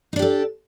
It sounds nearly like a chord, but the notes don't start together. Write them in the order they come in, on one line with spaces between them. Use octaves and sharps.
D#4 D4 G4 A4